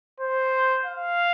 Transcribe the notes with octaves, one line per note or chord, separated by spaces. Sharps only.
C5
F5